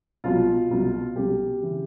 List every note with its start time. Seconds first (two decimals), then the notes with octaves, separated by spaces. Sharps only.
0.24 C2 B2 F#3 F4
0.71 C2 B2 F#3
1.16 C2 B2 F#3 G4
1.62 C#3 E3